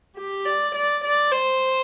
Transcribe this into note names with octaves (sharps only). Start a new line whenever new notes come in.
G4
D5
D5
D5
C5